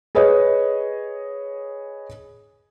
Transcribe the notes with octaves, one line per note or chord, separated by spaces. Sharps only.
G#4 B4 C#5 D#5